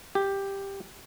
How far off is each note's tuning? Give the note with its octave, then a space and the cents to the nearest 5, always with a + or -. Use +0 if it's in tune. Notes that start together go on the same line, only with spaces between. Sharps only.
G4 +5